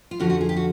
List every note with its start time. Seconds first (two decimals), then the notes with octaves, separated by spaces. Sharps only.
0.11 F4
0.19 F2 D3 F3 F#4
0.30 F#4
0.41 G#4
0.49 G4
0.56 F#4